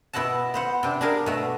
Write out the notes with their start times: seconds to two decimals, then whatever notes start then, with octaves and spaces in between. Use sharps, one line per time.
0.13 B2 E4 D#5 F#5 A5
0.54 B3 C5 F#5
0.83 C3 D4
1.01 D4 G#4 A#4 F5
1.26 B2 A3